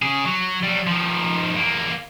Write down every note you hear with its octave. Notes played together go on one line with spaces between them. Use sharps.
C#3 G#4
F#3
F#3 G3
D#3 F3
E2 A#3